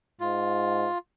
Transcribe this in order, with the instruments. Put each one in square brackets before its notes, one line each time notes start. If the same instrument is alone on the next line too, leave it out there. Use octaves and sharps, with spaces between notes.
[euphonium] G#2 [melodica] F4